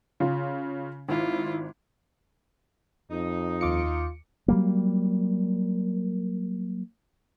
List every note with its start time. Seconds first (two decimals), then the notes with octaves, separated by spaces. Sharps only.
0.20 C#3 F4
1.09 G#1 E4 F4
3.11 F2 D#4
3.61 D#2 F4 D6 C#7
4.48 F#3 G3 A#3